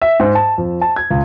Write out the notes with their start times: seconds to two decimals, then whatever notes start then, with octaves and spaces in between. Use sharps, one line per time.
0.02 E5
0.20 G#2
0.35 A5
0.58 F2
0.81 A5
0.96 G#6
1.11 C#2